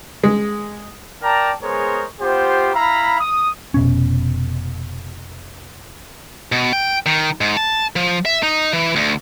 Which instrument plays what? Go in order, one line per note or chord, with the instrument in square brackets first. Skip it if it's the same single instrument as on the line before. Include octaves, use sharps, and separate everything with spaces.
[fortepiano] G#3
[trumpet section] A#4 D5 G5 A5 A#5
G#3 B3 G#4 A#4 C5 C#5
B3 F4 G4 C5
E4 F5 A#5 B5
D#6
[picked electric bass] F1 B2 C#4
[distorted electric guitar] B2
G5
D#3
G#2
A5
F3
E5
D#4
E3
D2